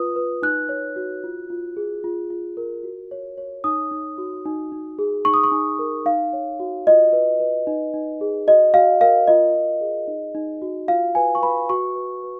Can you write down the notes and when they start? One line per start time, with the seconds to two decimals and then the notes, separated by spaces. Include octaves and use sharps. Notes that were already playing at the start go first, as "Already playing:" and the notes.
Already playing: F4 B4 D#6
0.16 B4
0.42 D#4 F#6
0.69 C#5
0.96 F#4
1.24 F4
1.50 F4
1.77 G#4
2.04 F4
2.30 F4
2.57 A#4
2.84 F#4
3.11 C#5
3.38 C#5
3.64 D#4 D#6
3.91 D#4
4.18 F#4
4.46 D#4
4.72 D#4
4.99 G#4
5.25 D#4 C#6
5.34 D#6
5.43 C#6
5.52 D#4
5.79 A#4
6.05 D#4 F5
6.33 C#5
6.60 F#4
6.87 F4 D#5
7.13 B4
7.40 B4
7.67 D#4
7.94 D#4
8.21 G#4
8.47 F#4 D#5
8.74 F#4 F5
9.01 A#4 F5
9.27 F4 D#5
9.54 F4
9.81 G#4
10.08 D#4
10.35 D#4
10.62 F#4
10.88 F4 F5
11.15 B4 G#5
11.35 C#6
11.42 B4 B5
11.69 F#4 C#6
11.95 B4
12.23 B4